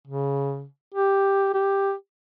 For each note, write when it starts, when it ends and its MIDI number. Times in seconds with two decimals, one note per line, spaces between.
0.07 0.66 49
0.94 1.50 67
1.54 1.93 67